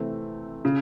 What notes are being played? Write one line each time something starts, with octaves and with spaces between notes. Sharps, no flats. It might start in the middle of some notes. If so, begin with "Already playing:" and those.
Already playing: C3 E3 A3 C4
C#3